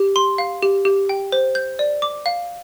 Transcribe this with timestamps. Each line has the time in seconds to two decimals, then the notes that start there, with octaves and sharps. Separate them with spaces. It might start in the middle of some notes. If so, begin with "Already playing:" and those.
Already playing: G4
0.16 C6
0.38 F5
0.63 G4
0.85 G4
1.09 G5
1.32 C5
1.55 G6
1.79 D5
2.02 D6
2.26 F5